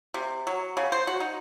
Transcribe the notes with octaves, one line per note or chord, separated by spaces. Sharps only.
C3
F#3
C#3
C5
F#4
D#4